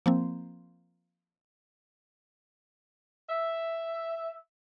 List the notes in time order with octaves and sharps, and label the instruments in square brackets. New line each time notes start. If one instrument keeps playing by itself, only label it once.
[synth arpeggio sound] F3 A#3 C4
[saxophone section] E5